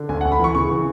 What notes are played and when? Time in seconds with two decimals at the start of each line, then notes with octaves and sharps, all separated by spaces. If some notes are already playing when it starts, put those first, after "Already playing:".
Already playing: D3
0.09 D2 G#5
0.21 D2 F#5
0.32 B5
0.39 E3 C#6
0.55 C#3 C#6
0.71 E3